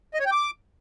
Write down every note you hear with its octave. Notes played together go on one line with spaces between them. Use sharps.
D#5
C#5
G5
D6